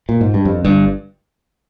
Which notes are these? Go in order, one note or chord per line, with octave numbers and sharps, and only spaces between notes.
A#2
G#2
G2
F2
G1 G2